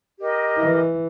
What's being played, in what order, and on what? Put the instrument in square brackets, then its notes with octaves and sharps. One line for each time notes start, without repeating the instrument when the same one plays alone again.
[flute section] G4 A#4 D#5
[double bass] E3